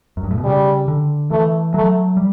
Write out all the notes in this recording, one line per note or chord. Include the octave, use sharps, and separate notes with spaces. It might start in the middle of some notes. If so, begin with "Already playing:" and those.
F#2
G2
A2
B2
C#3 G3
D3
E3 A3
F#3 A3
G3